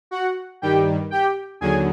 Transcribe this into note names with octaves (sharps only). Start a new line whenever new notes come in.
F#4 F#5
G2 D#3 G3 G4 G5
G4 G5
D#2 D3 F#3 G#4 G#5